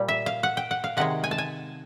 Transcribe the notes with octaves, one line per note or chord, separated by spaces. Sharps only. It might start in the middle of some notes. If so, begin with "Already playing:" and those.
Already playing: A#2 G3
E5
F5
F#5
G5
F#5
F5
C3 D#3 G#3 F#5
G#5
A5
G#5